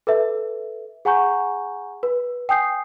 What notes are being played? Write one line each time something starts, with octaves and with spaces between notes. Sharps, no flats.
A4 B4 E5
G#4 F#5 G#5 A#5 C#6 G6
B4
G5 G#5 D#6 G6 C7